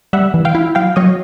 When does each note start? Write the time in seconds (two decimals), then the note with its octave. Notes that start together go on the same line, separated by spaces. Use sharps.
0.13 G3 E5 F#5
0.34 E3
0.45 F5 G5
0.55 E4
0.75 F#3 F5 G5
0.96 F#3 C#5 D#5